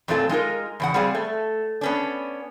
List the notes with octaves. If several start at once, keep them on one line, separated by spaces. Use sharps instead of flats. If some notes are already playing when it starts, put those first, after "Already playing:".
F2 A#2 A3 C4 F4 A4
G#3 D#4 F4 A#4
E2 C#3 F#5
G3 B3 C4 G#4 D5 F5
A3
B3 C#4 D4